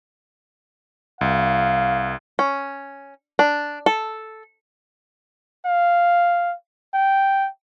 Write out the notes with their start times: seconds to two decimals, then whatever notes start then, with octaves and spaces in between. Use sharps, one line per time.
1.21 C2 F5
2.39 C#4
3.39 D4
3.86 A4
5.65 F5
6.94 G5